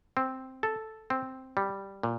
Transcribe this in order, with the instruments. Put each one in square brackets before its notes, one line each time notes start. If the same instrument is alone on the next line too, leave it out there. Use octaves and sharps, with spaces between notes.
[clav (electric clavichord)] C4
A4
C4
G3
A#2